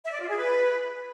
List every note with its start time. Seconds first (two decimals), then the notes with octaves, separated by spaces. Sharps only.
0.03 E5
0.12 D5
0.20 F4
0.29 G#4
0.37 B4